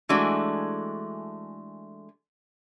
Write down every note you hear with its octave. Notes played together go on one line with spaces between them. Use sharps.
E3 G#3 A3 D4 F#4